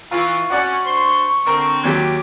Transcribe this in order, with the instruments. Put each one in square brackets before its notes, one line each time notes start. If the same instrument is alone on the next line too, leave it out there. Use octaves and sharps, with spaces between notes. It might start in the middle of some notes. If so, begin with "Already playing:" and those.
[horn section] E3 [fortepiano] F4 [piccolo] C#6
[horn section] C#4 [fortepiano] F#4 D5 F#5
[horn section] D4 C5 C6
[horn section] D3 C4 [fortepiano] A#4
[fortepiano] D#2 F#3 G4 [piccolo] D6